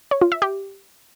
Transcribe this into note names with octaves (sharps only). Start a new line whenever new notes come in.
C#5
F4
E5
G4